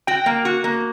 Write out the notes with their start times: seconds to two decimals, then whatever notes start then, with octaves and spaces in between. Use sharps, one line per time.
0.07 F#4 G5
0.26 A#3
0.45 F#4
0.64 A#3